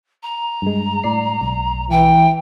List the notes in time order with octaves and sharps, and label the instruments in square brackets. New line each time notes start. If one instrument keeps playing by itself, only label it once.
[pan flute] A#5
[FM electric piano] G2 G#3
A2 D5 C7
B1
[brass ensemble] E3 [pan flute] G5